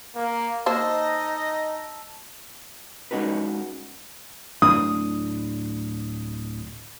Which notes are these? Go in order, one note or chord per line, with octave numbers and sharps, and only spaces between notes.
A#3
A#3 D#4 C5 D#5 A5 E6
G#3 C#4 D#4 F#4 B4
D1 A2 D4 D#6